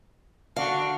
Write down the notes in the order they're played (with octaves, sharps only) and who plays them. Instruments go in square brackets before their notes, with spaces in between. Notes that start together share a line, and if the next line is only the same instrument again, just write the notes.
[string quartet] D3 D4 F#4 [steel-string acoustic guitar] F5